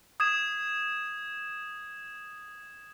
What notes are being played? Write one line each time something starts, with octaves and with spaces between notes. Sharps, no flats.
D#6 G#6 E7